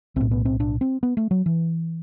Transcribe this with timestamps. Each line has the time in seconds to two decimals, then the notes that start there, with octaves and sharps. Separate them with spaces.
0.16 B1 A2 C4
0.31 B3
0.45 C4
0.60 D4
0.81 C4
1.03 B3
1.17 A3
1.31 F#3
1.46 E3